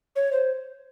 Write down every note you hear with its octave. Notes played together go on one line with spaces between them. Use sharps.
C#5
C5